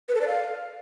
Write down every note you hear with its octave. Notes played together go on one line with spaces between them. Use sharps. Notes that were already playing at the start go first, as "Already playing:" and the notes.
B4
A4
D5
F5